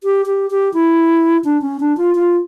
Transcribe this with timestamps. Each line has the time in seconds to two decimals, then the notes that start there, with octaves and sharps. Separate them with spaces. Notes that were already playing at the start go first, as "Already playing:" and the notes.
0.04 G4
0.26 G4
0.51 G4
0.74 E4
1.44 D4
1.62 C#4
1.80 D4
1.97 F4
2.15 F4